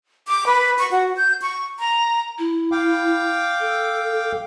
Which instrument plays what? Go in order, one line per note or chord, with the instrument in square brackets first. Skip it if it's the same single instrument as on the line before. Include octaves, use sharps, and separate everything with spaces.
[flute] D6
B4
C#6
F#4
G6
C#6
A#5
[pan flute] E4
[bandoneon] F5 G5 D6
[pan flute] A4